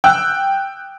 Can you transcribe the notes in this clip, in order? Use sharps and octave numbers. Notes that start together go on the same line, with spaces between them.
G5 E6 F#6